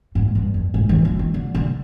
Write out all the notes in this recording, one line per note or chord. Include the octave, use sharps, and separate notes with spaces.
G#2
G2
F2
G#2
D#3
F3
D#3
D3
D3